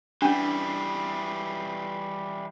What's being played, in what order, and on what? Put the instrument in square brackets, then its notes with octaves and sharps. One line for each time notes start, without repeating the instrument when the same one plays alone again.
[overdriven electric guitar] E3 G3 [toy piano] C#4 D4